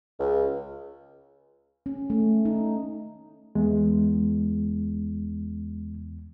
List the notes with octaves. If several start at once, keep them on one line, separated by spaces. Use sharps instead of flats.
C#2
C#4
A3
D#4
E2 G#3